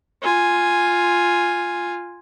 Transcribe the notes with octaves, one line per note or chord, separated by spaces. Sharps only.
F4 G#5